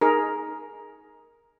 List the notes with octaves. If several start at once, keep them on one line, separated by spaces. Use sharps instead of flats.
D#4 G#4 A#4